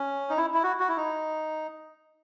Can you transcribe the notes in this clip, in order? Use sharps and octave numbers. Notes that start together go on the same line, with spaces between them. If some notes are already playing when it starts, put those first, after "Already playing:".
Already playing: C#4
D#4
E4
E4
F#4
F#4
E4
D#4